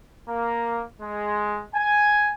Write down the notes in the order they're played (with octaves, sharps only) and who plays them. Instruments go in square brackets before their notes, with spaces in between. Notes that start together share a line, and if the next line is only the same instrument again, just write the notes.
[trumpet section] A#3
G#3
G#5